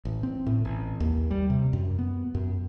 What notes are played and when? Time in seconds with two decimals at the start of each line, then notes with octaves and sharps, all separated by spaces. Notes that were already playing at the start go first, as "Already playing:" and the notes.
0.05 A1
0.23 C4
0.46 A2
0.65 A1
1.00 D#2
1.31 G3
1.50 C3
1.73 F#2
1.98 B3
2.35 F#2